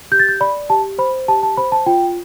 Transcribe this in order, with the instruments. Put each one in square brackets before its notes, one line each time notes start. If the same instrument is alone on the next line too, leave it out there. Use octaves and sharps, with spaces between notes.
[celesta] G4 G6
A6
G6
D5 B5
G4 A5
C5 B5
G4 A5
A5
C5 B5
A5
F4 G5